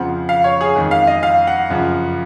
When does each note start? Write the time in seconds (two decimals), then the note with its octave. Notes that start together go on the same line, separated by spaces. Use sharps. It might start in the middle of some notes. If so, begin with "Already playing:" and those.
Already playing: F2 C#3 F3 C4 F#5
0.29 F5
0.44 C#5
0.61 G#4
0.76 F2 D#3 G#3
0.91 F5
1.07 D#5
1.23 F5
1.47 F#5
1.70 F#2 C#3 F3